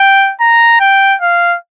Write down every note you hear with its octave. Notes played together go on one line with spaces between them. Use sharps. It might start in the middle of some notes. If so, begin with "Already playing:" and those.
Already playing: G5
A#5
G5
F5